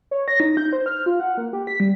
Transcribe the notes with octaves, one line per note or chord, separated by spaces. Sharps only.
C#5
A#6
D#4
G6
C5
F6
F4
F#5
A#3
G4
B6
G3